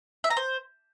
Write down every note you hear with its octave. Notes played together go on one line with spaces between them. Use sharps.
E5
A#5
C5